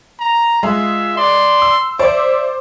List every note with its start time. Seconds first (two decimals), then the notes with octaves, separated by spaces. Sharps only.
0.19 A#5
0.63 G#3 F4 E5
1.17 D5 C6
1.62 E6
1.99 C5 D5 E5 D6